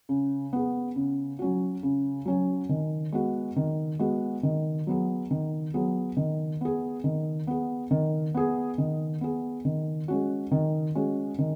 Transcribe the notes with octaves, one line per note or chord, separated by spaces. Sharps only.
C#3
B3 G#4
C#3
F#3 C#4 F#4
C#3
F#3 C#4 F#4
D#3
G#3 B3 F#4
D#3
G#3 B3 F#4
D#3
F#3 B3 G#4
D#3
F#3 B3 G#4
D#3
B3 G#4
D#3
B3 G#4
D#3
B3 G#4
D#3
B3 G#4
D#3
G#3 C#4 F#4
D#3
G#3 C#4 F#4
D#3